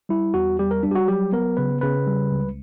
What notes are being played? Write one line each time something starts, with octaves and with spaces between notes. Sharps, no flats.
G3 E4
E2 F#4
G3 G4
A#4
G3 D4
G4
F#4
F#3 G4
B3 A#4
C#3 B4
C#3 B4
G3
C#2